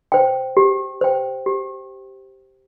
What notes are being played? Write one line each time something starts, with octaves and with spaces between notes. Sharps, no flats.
C5 G5
G4
C5 G5
G4